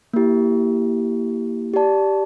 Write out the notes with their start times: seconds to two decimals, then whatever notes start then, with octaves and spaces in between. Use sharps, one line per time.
0.13 A#3 E4 G4
1.74 G4 D5 A5